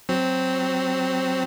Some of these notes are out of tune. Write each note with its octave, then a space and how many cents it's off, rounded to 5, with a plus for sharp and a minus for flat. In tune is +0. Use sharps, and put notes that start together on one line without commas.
F#3 +0 C4 +0